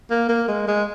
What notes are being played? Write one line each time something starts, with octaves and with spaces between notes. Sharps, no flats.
A#3
A#3
G#3
G#3